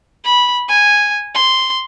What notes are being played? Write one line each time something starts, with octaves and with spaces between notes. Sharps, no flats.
B5
G#5
C6